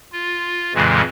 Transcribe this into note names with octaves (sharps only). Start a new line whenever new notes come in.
F4
F2 A#2 C#3 E3 G#3